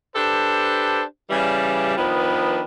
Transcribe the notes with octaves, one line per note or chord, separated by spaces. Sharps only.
D4 G4 A4 B4 C5
C#3 E3 G3
D#3 F3 B3 D4 B4